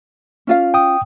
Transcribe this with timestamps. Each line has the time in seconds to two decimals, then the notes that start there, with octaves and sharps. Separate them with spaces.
0.47 C#4 F4 F5
0.74 G5 D#6